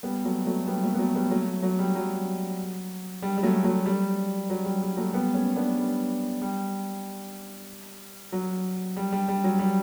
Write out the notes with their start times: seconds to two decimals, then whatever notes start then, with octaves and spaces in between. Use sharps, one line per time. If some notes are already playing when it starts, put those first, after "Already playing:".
0.03 G3 B3
0.24 F#3 A3
0.46 F#3 A3
0.67 G3 B3
0.83 F#3 A3
0.94 B3
0.99 F#3 A3
1.15 G3 B3
1.31 F#3 A3
1.63 F#3
1.79 G3
1.95 F#3
3.22 G3
3.38 G3
3.43 F#3 A3
3.64 F#3 A3
3.86 G3
4.50 F#3
4.65 G3
4.82 G3
4.97 F#3 A3
5.13 G3 B3
5.34 A3 C#4
5.56 B3 D4
5.77 G3
6.42 G3
8.32 F#3
8.97 G3
9.13 G3
9.28 G3
9.44 F#3
9.59 G3